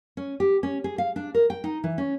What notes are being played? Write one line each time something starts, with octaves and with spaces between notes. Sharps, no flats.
C#4
G4
C#4
G#4
F5
D4
A#4
G5
D#4
E3
C#4